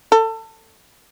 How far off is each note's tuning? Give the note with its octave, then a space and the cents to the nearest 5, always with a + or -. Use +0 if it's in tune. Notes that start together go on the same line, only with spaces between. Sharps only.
A4 +25